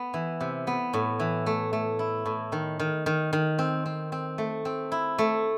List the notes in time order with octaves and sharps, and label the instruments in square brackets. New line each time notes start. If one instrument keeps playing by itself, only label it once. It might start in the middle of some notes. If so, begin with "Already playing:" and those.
Already playing: [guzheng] B3
E3
C3
B3
A2
E3
A3
A3
E4
A2
D#3
D#3
D#3
D#3
C4
C4
C4
A3
C4
E4
A3